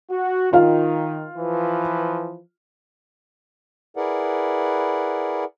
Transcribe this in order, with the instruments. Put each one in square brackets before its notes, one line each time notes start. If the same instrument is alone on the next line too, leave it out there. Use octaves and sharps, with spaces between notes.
[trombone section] F#4
[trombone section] D#3 [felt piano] F4 F5
[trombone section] E3 F3 B4
[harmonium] E4 G#4 A#4 B4 D5 F#5